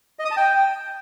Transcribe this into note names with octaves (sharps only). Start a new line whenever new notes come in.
D#5
D#6
A5
G5